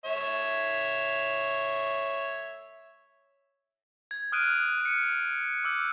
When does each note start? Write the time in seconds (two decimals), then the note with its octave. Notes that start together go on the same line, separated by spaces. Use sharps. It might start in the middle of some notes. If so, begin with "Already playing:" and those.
0.05 C#5 E5
4.11 G#6
4.32 D#6 F6 F#6 D7 D#7
4.81 C#7 D#7
5.64 D6 E6 G6